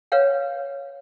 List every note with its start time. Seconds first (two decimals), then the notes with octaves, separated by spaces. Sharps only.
0.12 B4 C#5 F5 F#5